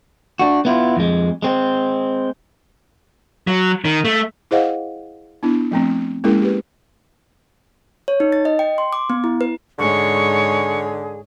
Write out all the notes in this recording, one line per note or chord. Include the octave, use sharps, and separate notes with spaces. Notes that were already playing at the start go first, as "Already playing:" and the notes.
D4 F#4
B3 E4 F4
F2 G#3
G#3 C4
F#3
D#3
A3
E4 G#4 C5 D#5 F5 F#5
B3 D4 E4
F3 A3 C4
G#3 A#3 C#4 E4 G#4 A#4
G4 B4
C#5
D#4
A6
D#5
G5
C6
D6
B3
E4
B4
G#2 D3 G#4 C#5 C#6